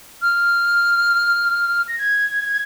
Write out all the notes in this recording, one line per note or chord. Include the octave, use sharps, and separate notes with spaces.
F6
A#6
G#6